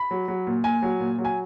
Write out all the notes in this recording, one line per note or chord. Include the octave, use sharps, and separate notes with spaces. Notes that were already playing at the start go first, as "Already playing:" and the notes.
Already playing: B5
F#3
F#3
A#2
A#2 G#5
F#3
A#2
F#3
G#5